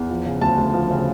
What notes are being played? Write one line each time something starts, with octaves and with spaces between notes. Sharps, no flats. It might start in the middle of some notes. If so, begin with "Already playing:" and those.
Already playing: E2
F3
C#3
D2 A5
D2
F3
C#3